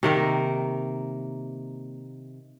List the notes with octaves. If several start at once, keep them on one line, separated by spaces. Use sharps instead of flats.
C3 D#3 A#3